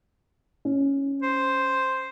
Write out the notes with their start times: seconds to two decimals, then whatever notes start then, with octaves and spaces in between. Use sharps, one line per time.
0.65 C#4
1.23 C5